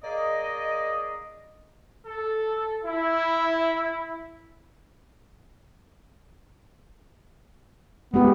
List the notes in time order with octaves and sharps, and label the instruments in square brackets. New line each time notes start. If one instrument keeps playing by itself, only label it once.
[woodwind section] A#3 G#4 D5 D#5
[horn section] A4
E4
[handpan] G#3 G4 [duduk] B3